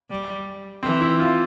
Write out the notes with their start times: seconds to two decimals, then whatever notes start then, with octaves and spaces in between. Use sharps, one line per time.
0.10 G3
0.83 E3 C4
1.01 E4
1.20 F4